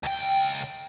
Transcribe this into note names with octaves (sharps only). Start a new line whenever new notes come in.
C#2 G5